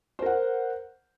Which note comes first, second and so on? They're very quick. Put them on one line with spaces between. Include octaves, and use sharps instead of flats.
C5 A#4 F#5